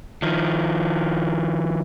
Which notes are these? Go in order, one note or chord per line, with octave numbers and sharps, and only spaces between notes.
D#3 F3